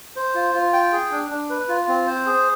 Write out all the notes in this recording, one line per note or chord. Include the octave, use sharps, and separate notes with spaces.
C5
F4
F4
G5
G#4
D4
D4
B4
F4
C4
C5
G#4